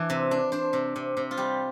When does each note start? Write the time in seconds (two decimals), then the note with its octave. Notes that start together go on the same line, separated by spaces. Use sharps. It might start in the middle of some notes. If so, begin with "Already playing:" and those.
Already playing: E3 D4 D5
0.10 C3
0.31 D4
0.52 D4 C5
0.73 C3
0.96 C3
1.17 C3
1.31 F4
1.37 G3 G4